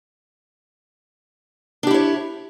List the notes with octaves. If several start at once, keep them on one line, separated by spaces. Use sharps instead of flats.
D4 E4 G4 C#5